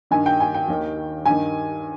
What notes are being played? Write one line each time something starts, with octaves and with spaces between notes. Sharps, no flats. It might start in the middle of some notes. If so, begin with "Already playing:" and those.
G2 D#3 G#5
G5
G#5
G5
D#2 D#3
G2 D#3 G#5